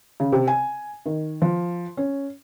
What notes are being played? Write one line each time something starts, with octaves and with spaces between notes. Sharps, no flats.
C#3
C3
G#5
D#3
F3
C#4